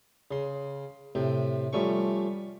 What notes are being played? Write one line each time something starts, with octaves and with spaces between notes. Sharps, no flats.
C#3 C6
A2 C3 C4
F3 G3 A3 C#4 C#6